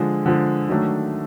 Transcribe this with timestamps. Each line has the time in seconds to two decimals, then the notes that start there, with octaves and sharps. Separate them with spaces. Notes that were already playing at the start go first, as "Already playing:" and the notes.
Already playing: D3 F3 G#3
0.26 D3 F3 G#3
0.69 D#3 F#3 A3 D4